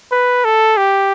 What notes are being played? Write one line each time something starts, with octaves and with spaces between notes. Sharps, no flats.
B4
A4
G4